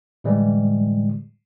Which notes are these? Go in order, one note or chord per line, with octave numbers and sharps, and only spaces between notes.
A2 D3 E3 G3 G#3